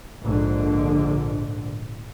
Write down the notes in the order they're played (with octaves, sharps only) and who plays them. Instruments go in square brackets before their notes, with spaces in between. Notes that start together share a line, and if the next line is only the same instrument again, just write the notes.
[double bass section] A#1 G#2 D3